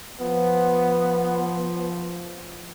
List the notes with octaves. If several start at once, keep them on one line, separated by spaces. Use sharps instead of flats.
F3 B3